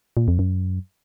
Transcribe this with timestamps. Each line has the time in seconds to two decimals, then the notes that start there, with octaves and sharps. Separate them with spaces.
0.17 A#2
0.28 F2
0.39 F#2